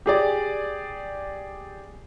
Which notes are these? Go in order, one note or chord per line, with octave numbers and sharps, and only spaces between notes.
G4 G#4 D5